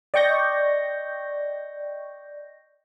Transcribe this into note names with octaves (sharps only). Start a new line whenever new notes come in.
D5 D#5 G5 C#6 G6 A#6